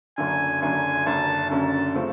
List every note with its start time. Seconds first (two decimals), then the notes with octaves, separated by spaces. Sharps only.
0.18 F#1 F#2 D3 G#5
0.62 F#1 F#2 D3 G#5
1.06 F#1 F#2 D3 A5
1.50 F#1 F#2 D3 A5
1.95 C#3 F3 A3 C4